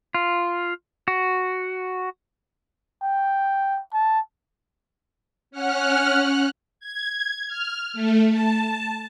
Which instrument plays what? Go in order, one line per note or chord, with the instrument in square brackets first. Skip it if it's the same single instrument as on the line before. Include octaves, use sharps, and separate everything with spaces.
[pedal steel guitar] F4
F#4
[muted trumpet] G5
A5
[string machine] C#4 F#5 F6 F#6
G#6
F6
A3
A5